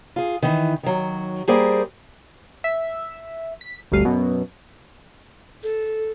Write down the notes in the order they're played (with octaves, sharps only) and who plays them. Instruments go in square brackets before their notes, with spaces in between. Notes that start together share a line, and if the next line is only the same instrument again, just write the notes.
[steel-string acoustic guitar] F4 G#4
D#3 E3
D#3 F#3
G3 A#3 G#4 A#4 C5 D5
[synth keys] E5
B6
G1 D2 G3 F5 D#7
F#2 B2 F#3
[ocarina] A4